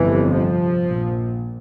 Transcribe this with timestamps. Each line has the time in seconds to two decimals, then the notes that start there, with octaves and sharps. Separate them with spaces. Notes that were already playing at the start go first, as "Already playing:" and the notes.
Already playing: G1 F2 C3 E3
0.33 F3
0.84 A#1 A#2